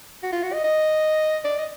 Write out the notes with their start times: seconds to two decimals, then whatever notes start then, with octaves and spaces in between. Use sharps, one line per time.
0.23 F#4
0.32 F4
0.43 F#4
0.53 D#5
0.64 D#5
1.44 D5
1.59 D#5